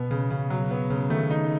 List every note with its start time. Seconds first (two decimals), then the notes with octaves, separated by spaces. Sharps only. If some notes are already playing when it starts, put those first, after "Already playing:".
Already playing: B2 B3
0.11 C#3
0.30 C#3
0.50 F#3
0.71 B3
0.90 C#3
1.10 D#3 A3
1.30 D#4